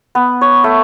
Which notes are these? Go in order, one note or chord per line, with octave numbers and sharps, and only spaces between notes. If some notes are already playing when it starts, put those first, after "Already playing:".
B3
C#5
A3